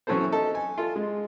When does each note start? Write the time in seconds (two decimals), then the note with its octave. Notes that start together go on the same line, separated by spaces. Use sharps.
0.07 E3 F#3 C#4 E4 A4 C5
0.32 D#4 A4
0.55 G#5
0.78 F4 A4
0.96 G#3